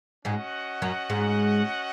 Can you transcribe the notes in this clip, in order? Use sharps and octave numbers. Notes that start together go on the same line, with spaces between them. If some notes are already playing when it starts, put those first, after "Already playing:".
G#2 G#3 C#4 F#4 D#5 F#5
F#2 F#3
G#2 G#3